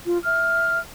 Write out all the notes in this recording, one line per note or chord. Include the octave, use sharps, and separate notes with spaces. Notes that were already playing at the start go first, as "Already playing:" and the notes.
F4
E5 F6